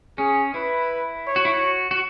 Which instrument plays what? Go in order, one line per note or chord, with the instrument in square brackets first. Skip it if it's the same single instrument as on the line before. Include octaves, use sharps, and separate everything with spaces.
[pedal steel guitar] C#4 [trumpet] G#4
[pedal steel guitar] E4 [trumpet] B4
[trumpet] C#5
[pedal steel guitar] F#4
E4
F#4
F#4